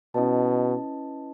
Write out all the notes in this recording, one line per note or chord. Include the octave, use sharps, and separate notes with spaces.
B2 C#4 E4 B4 D#5 A5